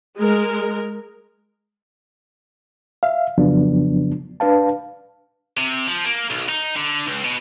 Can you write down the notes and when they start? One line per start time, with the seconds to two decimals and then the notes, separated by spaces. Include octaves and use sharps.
0.18 G#3 A#4
3.03 E5 F5
3.38 F2 C#3 F3 F#3 B3 D4
4.40 D4 B4 F5 A5
5.57 C3
5.87 F3
6.05 A#3
6.30 B1
6.49 D#4
6.76 D3
7.07 C#2
7.24 B2